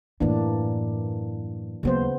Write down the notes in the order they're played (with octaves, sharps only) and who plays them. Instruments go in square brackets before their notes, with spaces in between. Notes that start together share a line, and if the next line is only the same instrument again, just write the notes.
[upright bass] F#2 A2 [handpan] E3 A#3 D4
[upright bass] D#2 F#3 [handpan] C#3 B3 C5